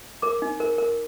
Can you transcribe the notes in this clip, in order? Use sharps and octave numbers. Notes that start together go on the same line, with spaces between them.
A#4 D6
D#4
A#4
A#4